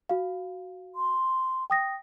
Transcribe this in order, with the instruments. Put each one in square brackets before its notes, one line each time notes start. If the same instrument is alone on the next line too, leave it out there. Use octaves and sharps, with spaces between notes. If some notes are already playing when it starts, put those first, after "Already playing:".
[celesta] F#4 F5
[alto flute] C6
[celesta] G5 D#6 A#6